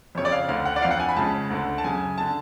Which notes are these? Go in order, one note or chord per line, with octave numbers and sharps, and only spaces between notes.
F2 C#3 C#5
D5
F5
D2 D3 F5
F#5
D5
F2 D3 F5
F#5
G#5
B5
C#2 C#3 A5
D2 D3
A5
F#2 C#3 G#5
D3 A5